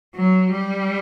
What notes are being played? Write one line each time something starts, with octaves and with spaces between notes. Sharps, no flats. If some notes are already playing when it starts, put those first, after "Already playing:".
F#3
G3